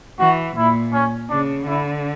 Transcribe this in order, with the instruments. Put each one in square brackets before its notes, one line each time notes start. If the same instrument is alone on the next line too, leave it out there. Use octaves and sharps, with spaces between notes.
[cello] E3 [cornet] F#4
[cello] A#2 [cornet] E4
[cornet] C#4
[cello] C#3 [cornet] D4
[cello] D3 [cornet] E4